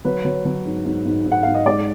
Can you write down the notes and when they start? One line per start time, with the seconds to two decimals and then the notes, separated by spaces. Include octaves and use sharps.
0.05 F#3 B4
0.25 F#3
0.45 F#3
0.65 G#2
0.85 G#2
1.06 G#2
1.26 G#2
1.32 F#5
1.43 G#2 F5
1.54 D#5
1.66 G#3 D5